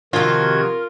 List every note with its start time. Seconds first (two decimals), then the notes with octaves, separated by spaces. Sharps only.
0.13 C3 D#3 F3 F4 F#4 A#4 G#6